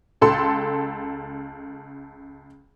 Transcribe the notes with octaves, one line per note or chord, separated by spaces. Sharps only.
C#2 A4 C6